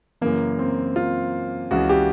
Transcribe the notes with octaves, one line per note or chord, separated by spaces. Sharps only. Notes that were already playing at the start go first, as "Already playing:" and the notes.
F#2 C#3 E3 A#3
C4
F4
C#2 C#3 E3 F#4
G4